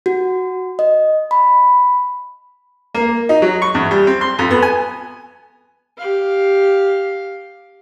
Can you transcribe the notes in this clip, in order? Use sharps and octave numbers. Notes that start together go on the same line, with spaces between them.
F#4
D#5
B5
A#3
D#4
F#3
C#6
E2
G3
C4
C6
F2
B3
G#5
G4 F5